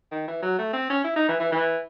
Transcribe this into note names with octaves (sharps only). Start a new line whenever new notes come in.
D#3
E3
F#3
A3
C4
C#4
E4
D#4
E3
E3
E3